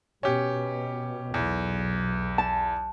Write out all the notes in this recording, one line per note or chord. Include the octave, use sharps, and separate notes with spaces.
B2 C#4 G4
B1 E2
A5